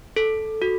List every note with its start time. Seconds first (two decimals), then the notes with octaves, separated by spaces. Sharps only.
0.16 A4
0.62 F#4